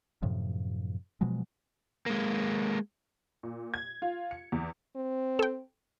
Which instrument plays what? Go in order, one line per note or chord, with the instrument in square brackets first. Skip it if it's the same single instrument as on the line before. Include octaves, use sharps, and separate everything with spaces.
[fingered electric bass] F#2 A2 C3 F3
B2 F3 F#3 G#3
[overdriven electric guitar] G#3 A#3
[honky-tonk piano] A#2
G#6
F4
C#7
E2
[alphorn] C4
[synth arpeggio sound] A4 G5